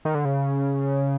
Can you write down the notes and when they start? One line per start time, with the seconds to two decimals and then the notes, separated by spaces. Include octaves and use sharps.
0.05 D#3
0.15 D3
0.25 C#3